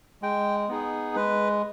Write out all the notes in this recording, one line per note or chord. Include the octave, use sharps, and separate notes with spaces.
G#3 G5
B3 D#4 G#4
G#3 B4